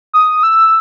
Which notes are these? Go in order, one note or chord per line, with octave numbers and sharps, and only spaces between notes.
D#6
E6